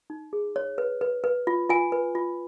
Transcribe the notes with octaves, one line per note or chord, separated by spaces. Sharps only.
D#4
G#4
C#5
B4
B4
B4
F4
F4 G#5
B4
F4